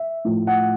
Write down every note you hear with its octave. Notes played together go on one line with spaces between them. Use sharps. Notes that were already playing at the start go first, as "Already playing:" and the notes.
Already playing: E5
A2 F3
F#5